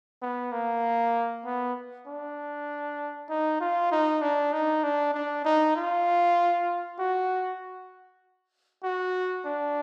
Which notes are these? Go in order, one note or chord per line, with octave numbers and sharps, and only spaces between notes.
B3
A#3
B3
D4
D#4
F4
D#4
D4
D#4
D4
D4
D#4
F4
F#4
F#4
D4